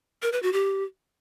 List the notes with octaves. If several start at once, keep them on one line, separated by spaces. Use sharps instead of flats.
A#4
B4
F#4
G4